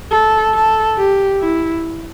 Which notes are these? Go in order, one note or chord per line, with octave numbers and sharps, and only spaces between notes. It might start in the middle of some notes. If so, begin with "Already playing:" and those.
A4
A4
G4
E4